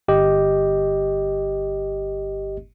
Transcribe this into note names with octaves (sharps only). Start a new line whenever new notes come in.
G1 G4 D#5